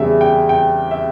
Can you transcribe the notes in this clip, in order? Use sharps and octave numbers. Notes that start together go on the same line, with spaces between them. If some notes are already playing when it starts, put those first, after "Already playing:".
Already playing: E2 C#3 G3 G#4 E5
G5
G5
E5